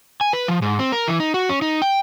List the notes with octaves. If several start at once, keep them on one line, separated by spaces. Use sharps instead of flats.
G#5
B4
F3
G#2
C4
A#4
E3
D#4
F#4
C#4
D#4
G5